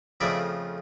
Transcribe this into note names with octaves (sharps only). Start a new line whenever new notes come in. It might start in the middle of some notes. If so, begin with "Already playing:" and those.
F2 C#3 F3 A3 D5 E5